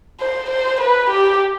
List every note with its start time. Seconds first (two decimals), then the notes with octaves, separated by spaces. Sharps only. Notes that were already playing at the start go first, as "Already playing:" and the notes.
0.21 C5
0.50 C5
0.80 B4
1.10 G4